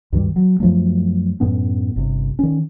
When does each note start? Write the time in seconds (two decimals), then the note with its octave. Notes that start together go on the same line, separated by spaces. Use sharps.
0.12 D2 G2 D#3 G3
0.36 F#3
0.60 F#2 F3 F#3 A3
1.40 F#2 A2 B3 C#4
1.96 G1 C3
2.39 D#3 C#4